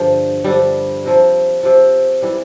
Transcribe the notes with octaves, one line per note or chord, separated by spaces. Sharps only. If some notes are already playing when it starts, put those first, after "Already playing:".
Already playing: G2 D3 F3
G2 D3 F3 G3
C3 F3
C3 F3
E3 G3